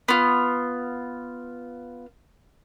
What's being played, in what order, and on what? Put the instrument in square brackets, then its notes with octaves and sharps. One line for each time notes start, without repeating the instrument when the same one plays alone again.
[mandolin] B3 F4